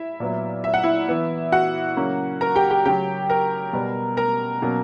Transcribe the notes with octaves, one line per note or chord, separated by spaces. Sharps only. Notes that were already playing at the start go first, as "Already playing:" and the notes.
Already playing: E4 E5
A#2 F#3 B3
E5
F#5
E4 E5
E3 B3
F#4 F#5
C#3 F#3 A#3 C#4
A#4 A#5
G4 G5
G4 G5
C#3 F#3 C#4 G4 G5
A#4 A#5
B2 G3 B3
A#4 A#5
B2 F#3 A#3 C#4